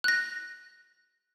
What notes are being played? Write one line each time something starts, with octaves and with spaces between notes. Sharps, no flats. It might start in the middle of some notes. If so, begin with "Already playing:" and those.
F#6 A#6